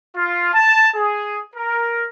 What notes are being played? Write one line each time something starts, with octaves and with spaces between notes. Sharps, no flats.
F4
A5
G#4
A#4